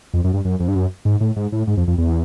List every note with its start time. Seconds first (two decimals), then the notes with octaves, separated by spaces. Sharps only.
0.14 F2
0.24 F#2
0.34 G2
0.45 F#2
0.60 F2
0.68 G2
0.76 F#2
1.05 G#2
1.21 A2
1.36 G#2
1.52 A2
1.67 G#2
1.77 F2
1.88 F2
1.98 E2